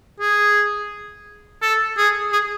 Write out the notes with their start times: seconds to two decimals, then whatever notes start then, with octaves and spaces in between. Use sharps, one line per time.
0.20 G#4
1.62 A4
1.97 G#4
2.33 G#4